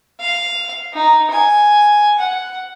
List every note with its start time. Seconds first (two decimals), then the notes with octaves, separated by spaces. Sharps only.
0.20 F5
0.94 D#4
1.31 G#5
2.19 F#5